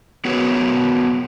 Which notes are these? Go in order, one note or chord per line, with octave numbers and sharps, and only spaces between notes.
B3 F#4 G#4 A#4 B4 C#5